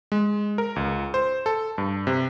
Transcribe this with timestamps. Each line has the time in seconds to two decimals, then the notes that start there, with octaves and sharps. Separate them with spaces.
0.12 G#3
0.58 A#4
0.76 C#2
1.14 C5
1.46 A4
1.78 G2
2.07 C3